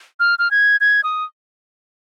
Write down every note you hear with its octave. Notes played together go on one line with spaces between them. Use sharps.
F6
F6
G#6
G#6
D#6